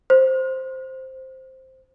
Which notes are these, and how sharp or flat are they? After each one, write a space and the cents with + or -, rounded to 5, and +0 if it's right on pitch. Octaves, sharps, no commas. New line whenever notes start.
C5 +5